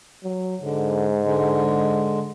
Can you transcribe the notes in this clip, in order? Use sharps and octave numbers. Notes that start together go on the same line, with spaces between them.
F#3
G#2 D3
D3 G#3